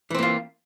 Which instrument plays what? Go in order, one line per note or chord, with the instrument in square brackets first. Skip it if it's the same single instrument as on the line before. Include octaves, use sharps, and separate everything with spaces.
[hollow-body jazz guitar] E3
C4
A#3
F4